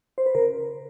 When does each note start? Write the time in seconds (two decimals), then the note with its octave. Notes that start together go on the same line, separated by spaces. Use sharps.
0.18 C5
0.26 B4
0.35 C#3 A#4